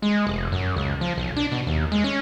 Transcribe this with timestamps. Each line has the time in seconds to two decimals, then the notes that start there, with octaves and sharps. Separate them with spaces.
0.02 G#3
0.27 F1
0.52 F#2
0.76 C#2
1.01 F3
1.17 B1
1.36 D4
1.52 B2
1.67 D#2
1.92 G#3
2.04 C#4